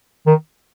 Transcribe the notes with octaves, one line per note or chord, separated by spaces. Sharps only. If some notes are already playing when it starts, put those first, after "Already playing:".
D#3